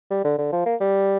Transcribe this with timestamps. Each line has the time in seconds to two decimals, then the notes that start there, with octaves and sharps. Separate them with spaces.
0.11 G3
0.25 D3
0.38 D3
0.52 F3
0.66 A#3
0.80 G3